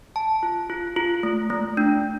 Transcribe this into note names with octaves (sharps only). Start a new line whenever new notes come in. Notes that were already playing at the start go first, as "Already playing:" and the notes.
A5
F4
F4
F4
A3
A3
D4